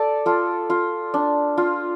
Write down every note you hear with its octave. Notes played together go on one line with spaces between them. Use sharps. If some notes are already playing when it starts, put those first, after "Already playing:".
Already playing: A4 D5
F4 A4
F4
D4
F4